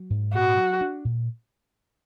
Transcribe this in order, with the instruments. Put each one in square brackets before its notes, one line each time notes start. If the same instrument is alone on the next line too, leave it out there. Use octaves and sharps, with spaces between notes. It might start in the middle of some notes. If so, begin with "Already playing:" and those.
Already playing: [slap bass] F#3
G#2
[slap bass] A#2 [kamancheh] F#4
[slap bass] F#3
D4
A#2